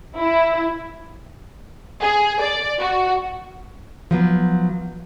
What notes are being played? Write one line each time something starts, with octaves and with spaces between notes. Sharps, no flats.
E4
G#4
D5
F#4
F3 F#3 B3